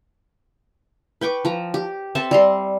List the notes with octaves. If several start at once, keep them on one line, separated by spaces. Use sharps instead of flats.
B4 G5 C#6 D6
F3 A#5
G4
C4 A4 E5 A5
G3 A#5 C6